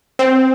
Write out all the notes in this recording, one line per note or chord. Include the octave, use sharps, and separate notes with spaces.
C4